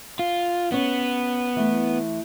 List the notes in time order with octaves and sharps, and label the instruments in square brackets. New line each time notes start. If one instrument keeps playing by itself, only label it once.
[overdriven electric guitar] F4
[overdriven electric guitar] B3 [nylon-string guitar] C#4 C#5
[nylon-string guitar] E3 A3